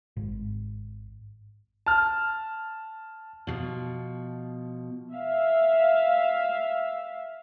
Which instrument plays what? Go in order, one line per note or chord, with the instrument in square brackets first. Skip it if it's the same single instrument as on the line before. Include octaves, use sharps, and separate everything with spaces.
[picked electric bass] G#1
[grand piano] A5 F6
[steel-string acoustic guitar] B2 F3
[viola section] E5 F5